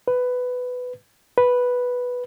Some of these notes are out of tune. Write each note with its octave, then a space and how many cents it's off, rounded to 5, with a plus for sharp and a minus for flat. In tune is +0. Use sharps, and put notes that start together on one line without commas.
B4 +10
B4 -5